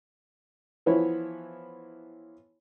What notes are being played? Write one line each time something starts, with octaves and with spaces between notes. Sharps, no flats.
E3 F3 B3 E4 C#5